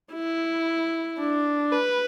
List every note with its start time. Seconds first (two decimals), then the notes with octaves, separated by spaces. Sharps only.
0.13 E4
1.19 D4
1.72 B4